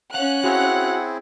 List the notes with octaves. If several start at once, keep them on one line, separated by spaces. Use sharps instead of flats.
C#4 F5 F#5 F#6
C4 E4 F#4 G#4 F5 F#5